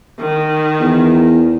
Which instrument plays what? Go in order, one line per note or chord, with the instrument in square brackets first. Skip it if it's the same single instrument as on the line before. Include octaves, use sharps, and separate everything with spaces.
[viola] D#3
[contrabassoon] E2